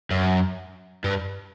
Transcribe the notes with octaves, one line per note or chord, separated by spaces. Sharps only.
F#2
G2